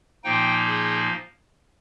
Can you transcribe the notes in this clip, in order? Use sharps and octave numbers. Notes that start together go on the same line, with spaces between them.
A#2 F3 A#3 D#4 G5
G#4